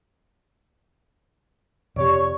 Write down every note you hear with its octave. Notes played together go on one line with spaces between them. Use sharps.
F2 C3 G4 C#5 D5